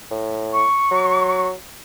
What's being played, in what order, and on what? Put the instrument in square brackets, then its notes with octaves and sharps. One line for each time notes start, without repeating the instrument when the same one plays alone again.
[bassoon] A2
[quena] C#6
[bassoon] F#3